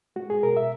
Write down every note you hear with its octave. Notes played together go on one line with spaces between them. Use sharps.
G#3 F#4
G#4
B2 A#4
E5